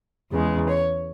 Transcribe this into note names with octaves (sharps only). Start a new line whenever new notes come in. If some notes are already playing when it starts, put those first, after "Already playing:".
E2 C#3 G#3
C#5